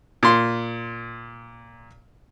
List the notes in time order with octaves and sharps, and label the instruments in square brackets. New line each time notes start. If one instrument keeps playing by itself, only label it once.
[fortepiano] A#2 C6